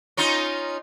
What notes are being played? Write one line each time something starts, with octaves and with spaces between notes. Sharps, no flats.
C#4 D#4 F4